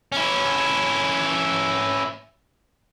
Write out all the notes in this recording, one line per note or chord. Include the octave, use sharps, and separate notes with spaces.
C#4 E4